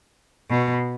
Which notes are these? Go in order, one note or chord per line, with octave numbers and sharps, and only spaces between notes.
B2